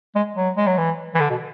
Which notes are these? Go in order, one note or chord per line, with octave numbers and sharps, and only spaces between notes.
G#3
F#3
G#3
F#3
E3
E3
D3
B2